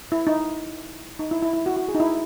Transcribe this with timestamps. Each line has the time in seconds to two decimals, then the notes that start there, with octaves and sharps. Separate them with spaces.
0.12 E4
0.27 D#4
1.19 D#4
1.31 E4
1.42 E4
1.54 E4
1.66 F#4
1.77 F#4
1.89 G#4
1.95 D#4
2.00 E4